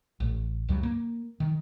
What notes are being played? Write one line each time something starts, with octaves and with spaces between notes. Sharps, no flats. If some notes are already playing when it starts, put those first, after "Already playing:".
A1
C#2 G2 F#3 G3
A#3
D#3